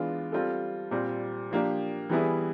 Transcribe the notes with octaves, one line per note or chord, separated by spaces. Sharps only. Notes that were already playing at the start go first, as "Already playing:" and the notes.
Already playing: E3 G#3 B3 D4 F4
G3 C4 F4 A4
A#2 G3 C4
F3 A#3 D4 G4
E3 G3 B3 E4 G#4